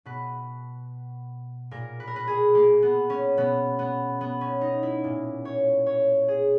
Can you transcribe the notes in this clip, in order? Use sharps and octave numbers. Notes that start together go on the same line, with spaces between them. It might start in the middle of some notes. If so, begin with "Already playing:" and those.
B2 B4
A#2 A#4
B4
A#4
B4
G#4
A#3
B3
C#4
B2 B3
B3
B3
C#4
D#4
E4
A#2
C#5
C#5
G#4